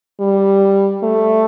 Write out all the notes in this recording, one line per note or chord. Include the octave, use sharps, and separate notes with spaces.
G3
A3